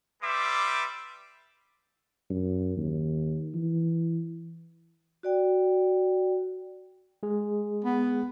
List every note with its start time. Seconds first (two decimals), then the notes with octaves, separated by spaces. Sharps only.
0.23 G3 B4 E5 C6 D6
2.30 F#2
2.77 D#2
3.54 E3
5.23 F#4 D5 G5
7.23 G#3 G#4
7.84 B3